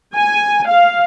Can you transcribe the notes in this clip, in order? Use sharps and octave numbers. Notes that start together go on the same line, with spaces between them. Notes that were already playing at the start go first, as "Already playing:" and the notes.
G#5
F5